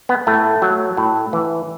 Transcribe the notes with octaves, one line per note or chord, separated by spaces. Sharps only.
B3
A2 A3
F#3
A2
E3